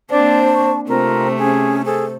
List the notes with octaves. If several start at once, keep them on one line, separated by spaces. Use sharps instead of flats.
A#3 C4 D4 C5 D5 A5
C#6
C3 A3 C4 F4 A#4
C#4 G#4
G#4 A4 C5